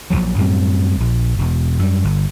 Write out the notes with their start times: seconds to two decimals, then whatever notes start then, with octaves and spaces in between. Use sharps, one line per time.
0.10 A#1 E2 F3 F#3
0.38 F#2 A2 G3 C4
1.00 A#1
1.38 E1
1.79 F#2 G3
2.04 G1